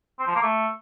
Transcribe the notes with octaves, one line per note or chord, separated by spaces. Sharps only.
C4
F3
A#3
A3